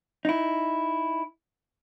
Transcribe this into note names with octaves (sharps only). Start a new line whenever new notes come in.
D#4 E4